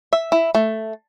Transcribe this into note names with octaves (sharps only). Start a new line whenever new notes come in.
E5
E4
A3